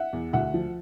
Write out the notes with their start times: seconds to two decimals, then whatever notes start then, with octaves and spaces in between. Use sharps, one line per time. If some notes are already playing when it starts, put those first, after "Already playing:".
Already playing: E5 F#5
0.13 E2
0.33 D2 E5 F#5
0.54 F3